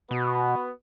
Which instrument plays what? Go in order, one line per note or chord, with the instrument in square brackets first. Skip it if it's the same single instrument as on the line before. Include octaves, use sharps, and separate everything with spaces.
[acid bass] B2 [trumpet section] B3 F#4 B4